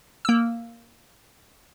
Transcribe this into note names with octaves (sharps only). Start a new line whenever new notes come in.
A#3 E6